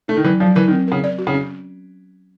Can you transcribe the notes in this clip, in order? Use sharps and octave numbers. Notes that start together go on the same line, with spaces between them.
A3 D#4
D#3
E3 F#3
F3 F#3
E3 A#4
D#3
C4
C#3 A#4
D5
F#4
C#3
C#4